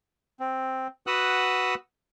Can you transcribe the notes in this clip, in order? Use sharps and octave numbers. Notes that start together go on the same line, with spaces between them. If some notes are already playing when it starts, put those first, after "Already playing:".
C4
F#4 B4 F#5 D#6 E6 F#6